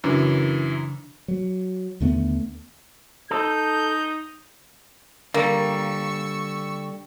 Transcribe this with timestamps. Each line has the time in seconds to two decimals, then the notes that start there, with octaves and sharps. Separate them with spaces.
0.04 F#2 C#3 E3 D4
1.28 F#3
2.00 D#2 D3 A3 B3
3.31 D#4 A4 G6
5.34 D3 G3 A#3 C#6 E6